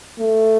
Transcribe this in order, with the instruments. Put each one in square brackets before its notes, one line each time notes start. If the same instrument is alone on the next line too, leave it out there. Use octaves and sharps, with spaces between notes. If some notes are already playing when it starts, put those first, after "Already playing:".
[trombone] A3